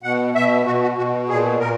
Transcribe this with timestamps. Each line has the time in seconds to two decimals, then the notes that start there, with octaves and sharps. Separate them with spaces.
0.03 B2 F#5
0.35 B2 E5
0.66 B2 F#4
0.82 F#4
0.97 B2 F#4
1.29 A#2 G#4
1.60 A#2 A#4